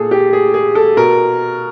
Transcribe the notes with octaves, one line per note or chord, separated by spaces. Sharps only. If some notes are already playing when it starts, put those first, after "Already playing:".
Already playing: A#2 G#4 A4
G4
G#4
G#4
A4
B2 A#4